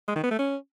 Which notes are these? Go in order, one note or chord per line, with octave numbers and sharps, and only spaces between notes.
G#3
D#3
B3
A3
C#4